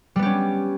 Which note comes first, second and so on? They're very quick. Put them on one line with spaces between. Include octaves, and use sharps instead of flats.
G3 B3 G4 C#4